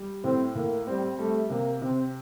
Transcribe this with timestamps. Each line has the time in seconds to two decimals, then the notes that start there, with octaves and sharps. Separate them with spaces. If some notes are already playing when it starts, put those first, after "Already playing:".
Already playing: G3
0.24 A2 C4
0.55 A2 A#3
0.87 G3 C4
1.18 G3 A3
1.50 C3 A#3
1.82 C3 C4